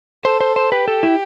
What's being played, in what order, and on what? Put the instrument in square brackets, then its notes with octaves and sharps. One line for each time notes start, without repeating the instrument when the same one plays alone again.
[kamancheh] A4 [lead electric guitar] C5
[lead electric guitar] C5
C5
[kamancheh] G4 [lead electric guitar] B4
[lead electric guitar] A4
E4